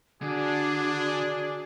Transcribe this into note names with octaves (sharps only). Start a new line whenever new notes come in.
D3 D4 F#4 G#4